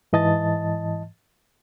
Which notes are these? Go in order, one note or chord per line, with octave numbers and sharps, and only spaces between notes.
G#2 E3 D#5 A5 A6